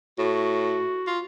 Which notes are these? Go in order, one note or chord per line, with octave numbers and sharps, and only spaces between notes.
A2 F#4
F4